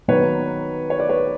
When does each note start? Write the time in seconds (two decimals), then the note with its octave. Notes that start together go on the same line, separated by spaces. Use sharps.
0.08 D#3 F#3 B3 B4 C#5
0.90 C#5
1.00 D5
1.09 B4 C#5